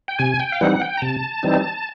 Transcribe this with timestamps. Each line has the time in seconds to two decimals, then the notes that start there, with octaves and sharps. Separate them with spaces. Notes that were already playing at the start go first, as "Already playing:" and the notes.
0.08 G5
0.19 C3 G#5
0.40 G5
0.52 F5
0.61 E3 G3 C4 D#4 F#5
0.82 G5
0.97 A#5
1.02 C3 A5
1.43 E3 G3 C4 D#4